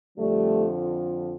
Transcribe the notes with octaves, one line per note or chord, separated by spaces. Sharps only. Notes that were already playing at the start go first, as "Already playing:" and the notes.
F2 D3 F3 G3 A3